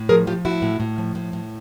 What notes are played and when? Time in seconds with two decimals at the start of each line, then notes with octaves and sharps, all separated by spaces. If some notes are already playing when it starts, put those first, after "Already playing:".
Already playing: A2
0.09 F3 G#4 A#4
0.27 F3 F4 G4
0.45 A2 E4 F#4
0.62 A2
0.80 A2
0.98 F3
1.15 A2
1.33 A2